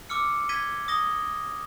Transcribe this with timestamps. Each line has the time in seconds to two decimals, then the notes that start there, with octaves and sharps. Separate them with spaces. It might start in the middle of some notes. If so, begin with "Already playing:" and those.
0.09 D6 E6 F6 C#7
0.49 G#6 A#6 B6 D#7 G7
0.88 D#6 A#6 G7